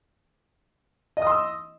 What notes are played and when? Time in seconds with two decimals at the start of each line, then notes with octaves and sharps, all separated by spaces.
1.17 D#5
1.22 D#6
1.27 C6
1.31 E6